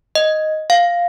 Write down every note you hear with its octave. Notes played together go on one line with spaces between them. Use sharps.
D#5
F5